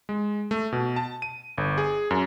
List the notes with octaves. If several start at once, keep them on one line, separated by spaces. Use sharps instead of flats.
G#3
A3
B2
A5
D#7
G1
G#4
F#2